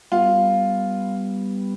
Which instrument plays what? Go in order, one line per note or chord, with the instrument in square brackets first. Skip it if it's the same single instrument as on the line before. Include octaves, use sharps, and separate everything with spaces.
[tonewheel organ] G3 B3 [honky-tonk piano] F4